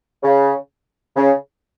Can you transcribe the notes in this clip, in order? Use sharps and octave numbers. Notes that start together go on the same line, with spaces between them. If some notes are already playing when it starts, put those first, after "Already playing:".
C#3
C#3